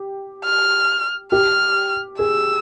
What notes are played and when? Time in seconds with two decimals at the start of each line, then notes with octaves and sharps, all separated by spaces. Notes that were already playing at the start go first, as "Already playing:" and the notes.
Already playing: G4
0.45 F6
1.32 G4 F6
2.19 G#4 E6